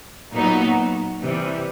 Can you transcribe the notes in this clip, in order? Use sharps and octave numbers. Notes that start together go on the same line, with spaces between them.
A#2 F#3 B3 D#4 F#4
C3 E3 G3